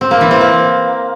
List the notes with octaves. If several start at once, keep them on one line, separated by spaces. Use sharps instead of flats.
C4
A#3
E3
C4
A#3